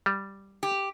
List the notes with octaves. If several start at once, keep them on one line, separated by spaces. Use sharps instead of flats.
G3
G4